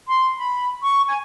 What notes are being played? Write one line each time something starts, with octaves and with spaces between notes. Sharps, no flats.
C6
B5
C#6
G#5